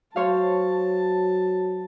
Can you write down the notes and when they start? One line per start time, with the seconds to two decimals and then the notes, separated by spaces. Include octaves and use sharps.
0.16 F#3 C5 C#5 F5 A5